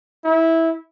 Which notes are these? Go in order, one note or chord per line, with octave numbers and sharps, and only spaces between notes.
E4